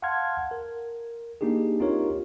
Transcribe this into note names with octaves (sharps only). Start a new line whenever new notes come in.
F5 F#5 A5 C6 F6 G#6
A#4
A#3 D4 D#4 G4 G#4
C4 D#4 F4 G4 A#4 C#5